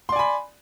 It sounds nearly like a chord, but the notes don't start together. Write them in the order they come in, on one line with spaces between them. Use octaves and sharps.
C6 D5 G#5 B5